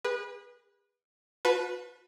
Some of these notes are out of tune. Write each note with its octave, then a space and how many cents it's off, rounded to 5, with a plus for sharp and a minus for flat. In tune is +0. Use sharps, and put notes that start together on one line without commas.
G#4 -40 B4 -20
F#4 -45 B4 +0 A5 -15